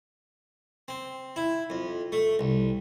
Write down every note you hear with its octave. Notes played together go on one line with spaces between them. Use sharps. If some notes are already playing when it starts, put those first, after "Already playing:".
C4
E4
F2
A3
C2